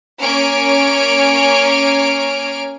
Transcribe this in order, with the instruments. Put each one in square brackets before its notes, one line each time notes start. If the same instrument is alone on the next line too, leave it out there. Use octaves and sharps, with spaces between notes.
[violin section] A#3 C#4 C#5 G#5 F6 D7